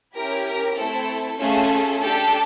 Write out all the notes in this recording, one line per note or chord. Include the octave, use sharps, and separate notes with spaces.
C#4 E4 G4 A#4
A#4
A3 C4 E4 A4
A3 C#4 F4 G#4 A4
D4 G4 A4